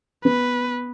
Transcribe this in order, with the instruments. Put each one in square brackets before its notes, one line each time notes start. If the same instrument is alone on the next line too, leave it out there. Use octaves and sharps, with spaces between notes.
[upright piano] B3 [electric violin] B4